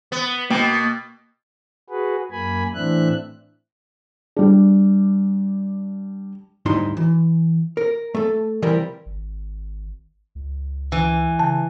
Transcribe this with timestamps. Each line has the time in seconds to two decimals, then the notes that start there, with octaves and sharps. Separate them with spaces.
0.12 B3
0.50 B2 A#3 G5
1.90 F#4 G#4 B4
2.31 F#2 A#3 G#5 B5
2.74 A2 E3 C4 D4 E5 F#6
4.36 G3 D4
6.66 D2 G#2 G3 D#4 E4 C6
6.97 E3
7.77 A#4
8.15 A3 A4
8.62 C3 E3 F3 G3 A#4
9.06 G#1
10.35 C#2
10.92 E3
11.39 C#3 A5